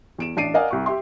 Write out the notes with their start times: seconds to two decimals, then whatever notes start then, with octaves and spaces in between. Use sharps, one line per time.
0.18 E2 D7 E7
0.37 A1 D4 A5 C7 D7 D#7
0.54 A#4 D5 D#5 F5 F#5 G#5
0.71 C2 C#6
0.86 G4 E5 C6